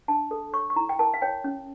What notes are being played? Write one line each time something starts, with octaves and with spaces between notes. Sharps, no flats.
D4 A5
A4
C#5 C#6
C#6
E4 A#5
G5
A#4 A5
F5
C#5 G5
C#4